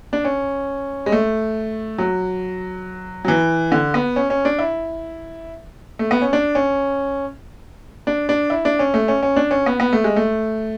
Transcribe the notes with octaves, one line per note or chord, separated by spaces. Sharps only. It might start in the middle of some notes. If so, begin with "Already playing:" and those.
D4
C#4
G#3
A3
F#3
F#3
E3
D3
B3
C#4
C#4
D4
E4
A3
B3
C#4
D4
C#4
D4
D4
E4
D4
C#4
A3
C#4
C#4
D4
C#4
B3
B3
A3
G#3
A3